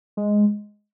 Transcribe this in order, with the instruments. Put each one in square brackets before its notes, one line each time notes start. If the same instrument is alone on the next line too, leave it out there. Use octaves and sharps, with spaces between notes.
[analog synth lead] G#3